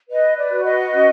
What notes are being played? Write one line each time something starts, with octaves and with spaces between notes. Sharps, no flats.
B4 D#5
D5
F#4
D#5
C#4